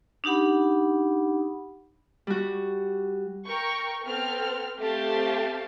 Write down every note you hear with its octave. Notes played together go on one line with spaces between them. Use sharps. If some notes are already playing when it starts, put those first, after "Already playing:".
D4 D#4 G4 F#5 B5
G3 F#4
A#4 G5 C#6
B3 C4 A4 F6
A3 C4 G4 F5 A5